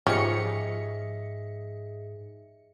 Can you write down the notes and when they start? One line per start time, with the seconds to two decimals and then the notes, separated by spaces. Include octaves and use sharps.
0.07 G#2 F3 C#4 G4 G#4 D#5 E5 C#7